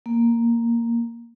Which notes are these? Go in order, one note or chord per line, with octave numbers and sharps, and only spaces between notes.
A#3